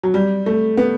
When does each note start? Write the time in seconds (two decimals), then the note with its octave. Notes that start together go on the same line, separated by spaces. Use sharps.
0.03 F#3
0.14 G3
0.46 A3
0.77 B3